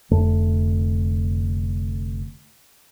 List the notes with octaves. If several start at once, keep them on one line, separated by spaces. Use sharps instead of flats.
F1 F2 D3 A3